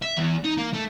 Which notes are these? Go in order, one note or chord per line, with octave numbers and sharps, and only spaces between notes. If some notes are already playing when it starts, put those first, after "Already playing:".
E5
E2
D#4
A#3
A3